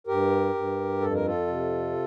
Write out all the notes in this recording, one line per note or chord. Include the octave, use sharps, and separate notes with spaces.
G2 G4 A#4
G2
F2 A4
A#4
F4 A4
C3